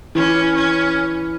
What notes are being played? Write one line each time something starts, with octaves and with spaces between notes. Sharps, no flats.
E3 C#4
C#4